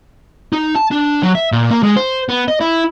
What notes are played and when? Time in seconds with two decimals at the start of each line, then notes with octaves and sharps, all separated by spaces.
0.53 D#4
0.76 A5
0.91 D4
1.23 F#3
1.35 E5
1.52 A#2
1.71 A#3
1.83 G#3
1.96 C5
2.29 B3
2.48 D#5
2.60 E4